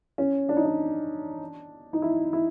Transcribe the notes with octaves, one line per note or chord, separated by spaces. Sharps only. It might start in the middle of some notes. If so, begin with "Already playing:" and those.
C#4
D4
D#4
D4
D#4
E4
E4